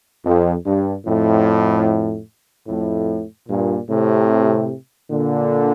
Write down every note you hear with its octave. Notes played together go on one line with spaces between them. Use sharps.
F2
G2
F2 A2
F2 A2
G2 A#2
A2 C3
A#2 D3